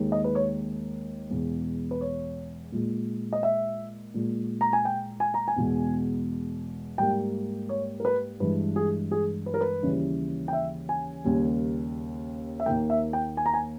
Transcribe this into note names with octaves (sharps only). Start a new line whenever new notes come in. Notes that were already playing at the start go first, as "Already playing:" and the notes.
Already playing: D#2 D#3 G#3
D#5
B4
C#5
E2 B2 G#3
B4
C#5
A#2 G#3
D#5
E5
A#2 G#3
A#5
G#5
G5
G#5
A#5
G#5
E2 B2 G#3
G#2 G3 A#3 G5
C#5
A#4
B4
G2 E3 G#3 B4
G#4
G#4
B4
A#4
B4
D#2 C#3 E3 G3
G5
E5
G#5
D#2 C#3 G3 A#3
E5
D#2 D#3 A#3 G5
E5
G5
G#5
A#5
G#5